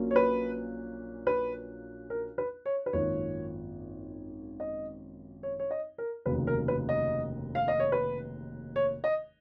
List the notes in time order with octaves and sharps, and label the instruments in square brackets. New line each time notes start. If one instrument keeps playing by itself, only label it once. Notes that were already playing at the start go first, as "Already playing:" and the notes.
Already playing: [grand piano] A#1 A#2 F#3 A#3 C#4
C#5
B4
B4
A#4
B4
C#5
B4
G#1 F#2 F3 A#3 C#4 C#5
D#5
C#5
C#5
D#5
A#4
F1 D#2 C#3 F#3 B4
A#4
B4
D#5
F5
D#5
C#5
B4
C#5
D#5